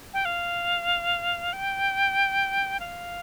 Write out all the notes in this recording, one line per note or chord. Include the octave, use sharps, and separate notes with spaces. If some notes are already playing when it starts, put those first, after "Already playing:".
G5
F5
G5
F5